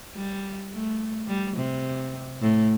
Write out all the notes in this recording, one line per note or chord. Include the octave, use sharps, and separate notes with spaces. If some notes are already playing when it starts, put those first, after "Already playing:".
G3
A3
G3
C3
A2